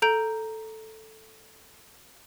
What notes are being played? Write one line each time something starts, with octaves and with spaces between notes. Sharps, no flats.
A4 A#5 G6 D7